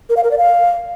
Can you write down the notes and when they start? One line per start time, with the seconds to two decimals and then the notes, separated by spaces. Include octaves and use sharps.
0.09 A#4
0.17 F5
0.24 A#4
0.31 D5
0.38 F5